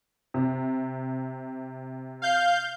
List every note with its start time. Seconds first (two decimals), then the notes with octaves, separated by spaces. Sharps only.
0.34 C3
2.22 F5 G6